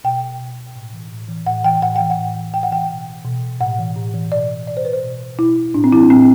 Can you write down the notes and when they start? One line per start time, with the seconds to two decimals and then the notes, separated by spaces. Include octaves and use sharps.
0.04 B2 G5
0.40 B2
0.75 A2
0.93 E3
1.12 A2
1.29 E3
1.46 A2 F#5
1.64 E3 G5
1.82 A2 F#5
1.96 E3 G5
2.10 F#5
2.19 A2
2.36 E3
2.54 A2 G5
2.63 F#5
2.71 E3 G5
2.90 B2
3.25 B2
3.60 A2 F#5
3.79 E3
3.96 A2
4.14 E3
4.32 B2 D5
4.67 B2 D5
4.77 C5
4.85 B4
4.93 C5
5.03 B2
5.39 B2 E4
5.74 A2 D4
5.84 C4
5.92 E3 E4
6.01 D4
6.10 A2 C4